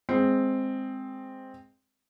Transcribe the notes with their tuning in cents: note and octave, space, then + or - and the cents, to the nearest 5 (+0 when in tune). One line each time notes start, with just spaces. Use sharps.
G#3 +0 C4 +0